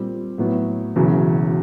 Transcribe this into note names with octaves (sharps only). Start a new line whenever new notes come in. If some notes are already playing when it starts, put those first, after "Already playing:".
Already playing: A#2 G3 C4
A2 F#3 B3
E1 E2 C#3 F#3